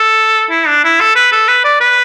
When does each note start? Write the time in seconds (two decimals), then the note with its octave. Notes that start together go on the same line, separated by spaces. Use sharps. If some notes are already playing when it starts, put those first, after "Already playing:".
Already playing: A4
0.51 E4
0.68 D4
0.84 E4
1.00 A4
1.16 B4
1.32 A4
1.48 B4
1.64 D5
1.81 B4